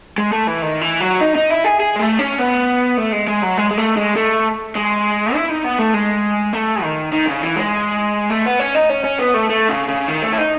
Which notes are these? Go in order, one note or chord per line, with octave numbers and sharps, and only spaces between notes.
G#3
A3
E3
D#3
E3
F#3
D#4
D#4
E4
G#4
G#4
G#3
A3
C#4
B3
A3
G#3
G#3
F#3
G#3
G#3
A3
G#3
A3
G#3
E4
D#4
B3
A3
G#3
A3
D#3
D#3
C#3
E3
G#3
A3
B3
C#4
D#4
C#4
C#4
B3
A3
A3
C#3
C#3
D#3
A3
E4
D#4